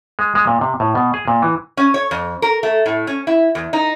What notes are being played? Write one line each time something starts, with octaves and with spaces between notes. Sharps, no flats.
G#3
G#3
A#2
C3
A2
B2
G#4
A#2
E3
C#4
C#5
F2
A#4
A3
A2
C#4
E4
E2
D#4